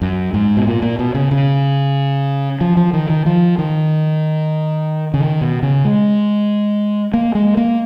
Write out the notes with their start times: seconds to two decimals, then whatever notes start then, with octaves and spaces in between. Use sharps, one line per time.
0.02 F#2
0.34 G#2
0.57 B2
0.67 A#2
0.82 A#2
0.99 B2
1.15 C#3
1.31 C#3
2.61 F3
2.77 F3
2.93 D#3
3.10 D#3
3.26 F3
3.58 D#3
5.14 C#3
5.20 D#3
5.41 B2
5.63 C#3
5.85 G#3
7.14 A#3
7.35 G#3
7.57 A#3